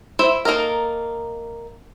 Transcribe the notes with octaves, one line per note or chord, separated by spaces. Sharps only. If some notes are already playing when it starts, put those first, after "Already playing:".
E4 C5 E5 B5
A#3 D#4 A4 A#4